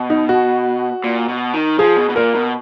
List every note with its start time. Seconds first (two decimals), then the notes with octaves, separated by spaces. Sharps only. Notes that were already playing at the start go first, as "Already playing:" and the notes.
Already playing: B2
0.10 D#4
0.29 F#4
1.04 A#2
1.29 B2
1.54 D#3
1.78 F3 G#4
1.97 B2
2.10 B2
2.16 A#2 A#4
2.35 B2